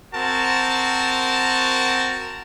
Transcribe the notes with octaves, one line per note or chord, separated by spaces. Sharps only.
C4 F#4 A#4 A5